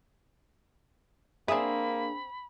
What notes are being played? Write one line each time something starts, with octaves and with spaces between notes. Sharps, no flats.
A#3 C4 D4 G#4 E5 B5